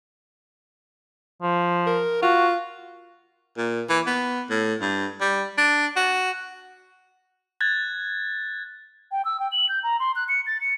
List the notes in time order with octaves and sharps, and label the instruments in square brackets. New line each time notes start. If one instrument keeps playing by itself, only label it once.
[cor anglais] F3
[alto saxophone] A#4
[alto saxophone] F4 [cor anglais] F#4
[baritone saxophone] A#2
E3
B3
A2
G2
G3
D4
F#4
[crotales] F#6 G#6 A6
[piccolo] G5
E6
G5
F#7
G6
A#5
C6
F#6
C#7
A6
C#7